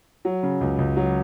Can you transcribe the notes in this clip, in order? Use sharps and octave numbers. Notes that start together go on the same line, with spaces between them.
F#3
C#3
C#2
C#2
F#3